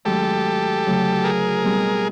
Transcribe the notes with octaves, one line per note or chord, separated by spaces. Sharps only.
G#2 D#3 F#3 A3 C#4 G4 A4
D2 C#3 F#3 A3
G#4 A#4
B2 G3 C4 D#4